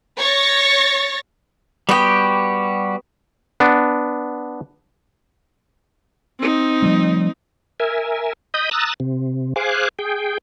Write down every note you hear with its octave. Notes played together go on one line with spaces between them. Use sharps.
C#5 C#6 A6 A#6
G3 B3 F#4 G4 G5
B3 D4
C4 D#4
F3 G3 A3
A#4 E5 G#5
D#5 B5 D#6 G6
A#5 D#6 E6 F#6 A6
C3
G#4 C5 F5 G#5 D6 F#6
G#4 G5